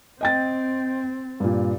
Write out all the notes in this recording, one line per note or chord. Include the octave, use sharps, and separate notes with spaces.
C4 D#5 G5 A6
G2 A#2